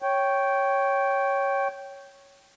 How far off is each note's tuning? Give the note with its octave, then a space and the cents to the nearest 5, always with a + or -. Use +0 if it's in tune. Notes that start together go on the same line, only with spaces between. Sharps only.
C#5 +0 G5 -10